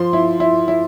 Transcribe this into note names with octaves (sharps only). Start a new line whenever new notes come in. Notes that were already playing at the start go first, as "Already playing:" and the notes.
Already playing: F3 C6
E4
E4
E4